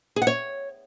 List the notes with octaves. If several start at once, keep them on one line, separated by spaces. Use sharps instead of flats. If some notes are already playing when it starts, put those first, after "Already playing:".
G#4
F#5
C#5